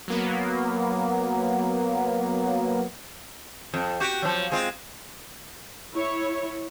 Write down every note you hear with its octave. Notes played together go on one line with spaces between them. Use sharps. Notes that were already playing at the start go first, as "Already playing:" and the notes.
F#3 A#3 B3
F2
F#4 G4
F3 F#3
G#3 C4 F4
E4 C#5